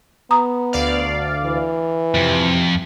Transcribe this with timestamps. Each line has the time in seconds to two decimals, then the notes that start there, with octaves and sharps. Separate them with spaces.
0.31 B3 A#5 D#6
0.73 D2 D5 F5
1.45 E3
2.15 F2 C3